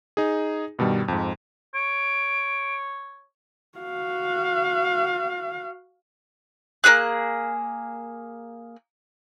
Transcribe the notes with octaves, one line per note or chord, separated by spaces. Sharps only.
D#4 G#4
G2 B2 D#3 G3
F2 G#2
C#5 D7
F#4 F5
A#3 D#4 G#4 F#6